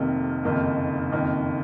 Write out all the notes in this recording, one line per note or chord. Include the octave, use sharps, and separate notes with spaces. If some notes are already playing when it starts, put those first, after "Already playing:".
Already playing: F1 F2 C3 D#3 A#3
F#1 F2 D#3 A#3 D#4
F#1 F2 D#3 A#3